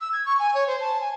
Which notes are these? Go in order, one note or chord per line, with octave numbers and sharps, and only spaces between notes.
E6
G#6
C#6
G#5
C#5
C5
A5
G#5